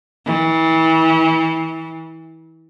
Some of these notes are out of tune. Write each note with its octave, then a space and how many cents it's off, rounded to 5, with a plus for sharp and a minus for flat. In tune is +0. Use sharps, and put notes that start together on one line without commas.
E3 -30